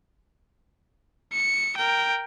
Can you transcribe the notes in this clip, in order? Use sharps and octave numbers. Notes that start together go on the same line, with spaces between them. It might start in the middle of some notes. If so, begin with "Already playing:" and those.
C#7
A#4 G5